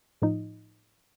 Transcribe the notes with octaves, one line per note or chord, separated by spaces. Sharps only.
A2 F3 D#4